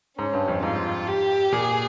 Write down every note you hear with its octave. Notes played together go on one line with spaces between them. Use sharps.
G#2 C#4
G2
F2
G#2 F4
G4
A#2 G#4